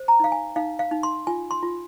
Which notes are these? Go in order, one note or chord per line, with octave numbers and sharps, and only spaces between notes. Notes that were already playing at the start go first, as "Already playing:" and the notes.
Already playing: C5
A#5
D#4 F5
G#5
D#4 F5
F5
D#4
C6
F4 G#5
C6
F4